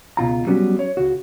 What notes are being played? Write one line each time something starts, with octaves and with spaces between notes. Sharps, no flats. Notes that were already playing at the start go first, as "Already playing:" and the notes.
C#2 B2 F4 A#5
F#3 G3 B3 C#4 F#4
C#5
C#2 F#4